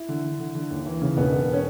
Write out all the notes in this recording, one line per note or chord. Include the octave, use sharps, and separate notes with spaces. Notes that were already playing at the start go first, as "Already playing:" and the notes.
Already playing: E4
D3
D3
D3
D3
D#2
E3
C#3
E1 B3
E1
C#4